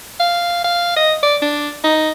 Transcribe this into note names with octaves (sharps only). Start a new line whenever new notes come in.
F5
F5
D#5
D5
D4
D#4